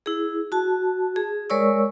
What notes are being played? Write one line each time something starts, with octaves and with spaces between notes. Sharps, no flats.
E4 G#4
F#4 A5
G#4
G#3 A#4 C#5 D5 C#6 E6